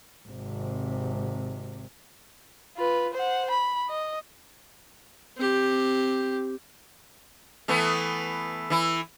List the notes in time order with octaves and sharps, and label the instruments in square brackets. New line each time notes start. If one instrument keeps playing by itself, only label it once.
[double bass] G#1 C3
[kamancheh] F4 B4
C5 F#5
B5
D#5
[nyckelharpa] C4 G4
[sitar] E3 A3 B3
E3 E4